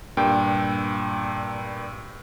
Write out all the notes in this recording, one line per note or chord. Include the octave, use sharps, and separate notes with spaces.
G2 A#2 G5